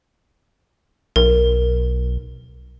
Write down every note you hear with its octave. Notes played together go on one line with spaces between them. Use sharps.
B1 A#4